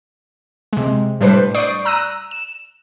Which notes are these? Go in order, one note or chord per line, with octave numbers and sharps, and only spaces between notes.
C3 G#3
A2 G3 D4 B4 C5 C7
D5 C#6 D#6 G6 C7 D7
A#5 E6 F#6 A#6 D#7
E7